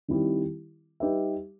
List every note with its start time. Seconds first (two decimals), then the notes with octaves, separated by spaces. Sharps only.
0.08 D#3 G3 C4 E4 G4
1.00 G3 D#4 G4 B4 E5